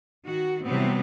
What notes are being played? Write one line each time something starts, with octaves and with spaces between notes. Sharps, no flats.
D#3 F#4
C3 E3 F#3 G3 B3 C4